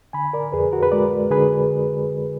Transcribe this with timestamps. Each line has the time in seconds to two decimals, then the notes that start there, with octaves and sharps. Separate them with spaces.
0.13 D3 G#5 B5
0.33 A#4 D5
0.52 F2 G#4 B4
0.72 F#4 A#4
0.83 B4
0.92 G#3 A#4 D5
1.31 D3 G#4 B4